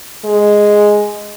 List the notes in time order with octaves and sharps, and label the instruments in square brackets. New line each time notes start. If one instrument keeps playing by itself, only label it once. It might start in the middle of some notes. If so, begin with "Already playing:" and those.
[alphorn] G#3